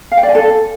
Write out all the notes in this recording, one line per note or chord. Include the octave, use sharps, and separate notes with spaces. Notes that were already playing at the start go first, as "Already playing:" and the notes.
F5
G5
D5
G#5
A4